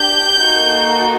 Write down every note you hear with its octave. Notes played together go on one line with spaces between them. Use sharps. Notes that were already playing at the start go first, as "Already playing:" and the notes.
Already playing: D4 G4 G6
A#3 D#4 F#4 A4